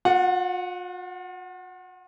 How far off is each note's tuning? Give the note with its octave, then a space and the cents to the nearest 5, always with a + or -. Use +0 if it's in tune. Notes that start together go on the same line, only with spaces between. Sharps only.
F4 +45 F#5 +0